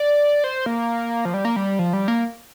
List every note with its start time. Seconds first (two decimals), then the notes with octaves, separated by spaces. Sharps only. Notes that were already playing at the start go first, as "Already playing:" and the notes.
Already playing: D5
0.44 C5
0.66 A#3
1.25 F3
1.34 G3
1.45 A#3
1.56 G3
1.79 F3
1.93 G3
2.08 A#3